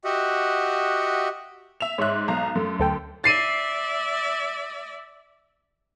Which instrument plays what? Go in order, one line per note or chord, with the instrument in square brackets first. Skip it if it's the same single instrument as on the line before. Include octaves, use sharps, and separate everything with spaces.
[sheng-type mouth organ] F#4 G4 D#5 E5 F#5
[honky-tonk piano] E5 E7 F7
[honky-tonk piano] G#2 F#6 [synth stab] C#5 E5
[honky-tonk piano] B1 A#5
F#2 A3
[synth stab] D2 A4 G5
[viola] D5 E5 [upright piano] A6 C7 D#7